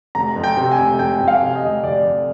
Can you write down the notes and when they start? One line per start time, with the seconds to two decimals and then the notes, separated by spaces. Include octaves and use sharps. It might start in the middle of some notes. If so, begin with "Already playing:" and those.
0.15 F1 A#5
0.36 F2
0.44 G5
0.57 C3
0.71 G#5
0.78 F1
0.99 F1 G5
1.20 F2
1.28 F5
1.42 C3
1.55 D#5
1.63 F1
1.83 F1 D5
2.05 F2